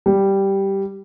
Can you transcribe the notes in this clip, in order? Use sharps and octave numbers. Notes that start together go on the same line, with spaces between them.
G3